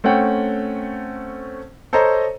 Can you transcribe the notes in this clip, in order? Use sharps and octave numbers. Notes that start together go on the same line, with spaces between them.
A3 C4 C#4 F#5 G5
A4 C5 C#5 D#5 A#5